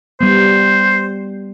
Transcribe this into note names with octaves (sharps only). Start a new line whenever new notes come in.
G3 B3 C5